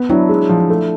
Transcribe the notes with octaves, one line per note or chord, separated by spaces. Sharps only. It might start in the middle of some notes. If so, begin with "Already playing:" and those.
Already playing: B3
F#3 D4 E4
G#3
F3
A3